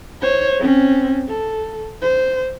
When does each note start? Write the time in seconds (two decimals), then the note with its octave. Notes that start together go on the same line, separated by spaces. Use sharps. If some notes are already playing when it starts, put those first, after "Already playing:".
0.22 C5 C#5
0.59 C4 C#4
1.28 A4
2.02 C5